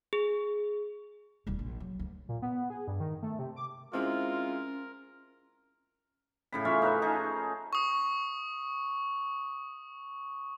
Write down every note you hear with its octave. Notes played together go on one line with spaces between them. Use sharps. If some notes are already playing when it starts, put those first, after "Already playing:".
G#4
E1 G3
A#1
F#3
D2
A#2
B3
G#4
G2
D#3
A3
C3
D6
G#3 C4 C#4 E4 F4 A#4
A2 C#3 B5
C#4 F4 E5 F5
D#4 A#4 B4 E5
D#4 G#4 A4 A#5
C#6 D#6